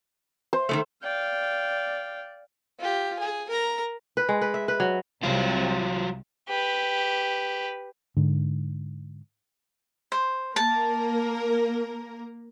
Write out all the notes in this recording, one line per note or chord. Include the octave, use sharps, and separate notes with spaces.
C5
D#3 F3 A3
D5 F5 G5
F4 G4
G#4
A#4 A#5
B4
G#3
B4
E5
B4
F#3
C2 C3 F#3 F4
G4 B4
G#2 D3
C5
A#3 A#4 A5